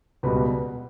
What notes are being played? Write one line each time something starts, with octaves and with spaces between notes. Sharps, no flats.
C#2 B2 G3 B4